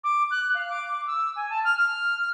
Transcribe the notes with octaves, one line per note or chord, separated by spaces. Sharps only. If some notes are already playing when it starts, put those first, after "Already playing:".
D6
F#6
F5
D6
E6
G#5
A5
F6
F6